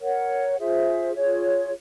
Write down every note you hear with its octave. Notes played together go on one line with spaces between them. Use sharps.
A#4 C#5 F#5
F4 G#4 C5 E5
F4 G#4 C#5